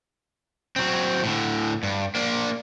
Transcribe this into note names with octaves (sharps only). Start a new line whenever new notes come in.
F#3 C4
A2 D3
G2
A#3 D4